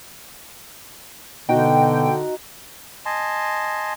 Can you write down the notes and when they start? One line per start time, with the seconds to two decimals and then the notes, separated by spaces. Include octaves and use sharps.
1.49 B2 D3 D#4 F#4 G5
3.06 D#5 G#5 A5 C6